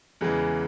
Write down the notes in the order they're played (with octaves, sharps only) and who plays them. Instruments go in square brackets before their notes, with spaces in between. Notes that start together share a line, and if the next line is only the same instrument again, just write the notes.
[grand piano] E2 C#3 E3 G#3